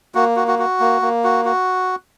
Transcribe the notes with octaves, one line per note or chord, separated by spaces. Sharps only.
A#3 F#4
F#4
F#4
F#4
A#3
A#3
F#4
F#4